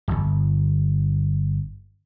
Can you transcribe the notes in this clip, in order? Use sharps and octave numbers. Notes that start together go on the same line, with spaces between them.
D1 G1